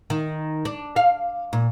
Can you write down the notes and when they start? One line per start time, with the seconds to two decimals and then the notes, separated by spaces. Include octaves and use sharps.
0.10 D#3
0.65 D4
0.96 F5
1.53 A#2